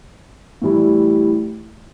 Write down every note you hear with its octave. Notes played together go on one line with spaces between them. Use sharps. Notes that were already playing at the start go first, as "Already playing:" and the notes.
A2 E3 G3 E4